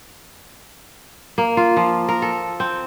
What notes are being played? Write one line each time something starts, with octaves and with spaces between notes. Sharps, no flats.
A#3
F4
F3
A#4
A4
C4